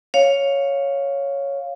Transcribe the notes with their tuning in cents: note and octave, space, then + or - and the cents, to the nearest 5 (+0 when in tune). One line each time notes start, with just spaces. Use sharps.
C#5 +0 F5 +5